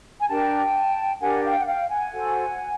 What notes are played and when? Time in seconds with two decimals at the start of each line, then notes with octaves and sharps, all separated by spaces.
0.19 G#5
0.29 D4 G4 A#4 G5 A5
1.20 D4 G4 A#4 F#5 G#5
1.44 F5 G5
1.57 F#5
1.66 F5 G5
1.89 F#5 G#5
2.12 F#4 A4 C5